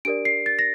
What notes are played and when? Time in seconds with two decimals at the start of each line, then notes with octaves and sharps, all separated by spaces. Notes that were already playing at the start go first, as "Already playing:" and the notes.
0.05 D4 G4 A#4 D5 D7
0.25 C7
0.46 A6
0.59 A#6